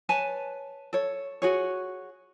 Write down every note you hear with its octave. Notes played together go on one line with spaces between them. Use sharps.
B4 C#5 G#5 A5
A4 C#5
F#4 G#4 C#5